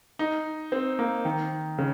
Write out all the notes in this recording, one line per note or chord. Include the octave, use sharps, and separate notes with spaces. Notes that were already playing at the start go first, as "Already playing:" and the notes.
D#4
C4
A#3
D#3
C#3